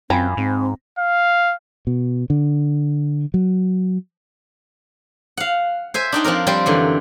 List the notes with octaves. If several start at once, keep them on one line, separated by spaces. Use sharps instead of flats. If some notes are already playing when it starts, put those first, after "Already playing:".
F#2 C4 F4 G5 G#5 A#5 B5
G#2 C4
F5
B2
D3
F#3
F5 F#5
C5 E5 G#5
D4 D#4 G5
F3 C4 D4 A#4
F3 G3 C4 C5
F#2 D3 E3